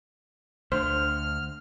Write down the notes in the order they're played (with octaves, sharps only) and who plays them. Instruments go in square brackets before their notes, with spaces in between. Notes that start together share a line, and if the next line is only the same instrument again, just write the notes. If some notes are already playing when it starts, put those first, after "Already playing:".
[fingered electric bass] D2 D3 [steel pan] C5 [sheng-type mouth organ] F6